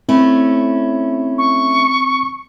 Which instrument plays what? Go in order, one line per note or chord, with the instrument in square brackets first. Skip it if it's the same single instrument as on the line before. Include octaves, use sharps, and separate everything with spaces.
[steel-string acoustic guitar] A3 C#4 E4 [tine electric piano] C4
[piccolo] C#6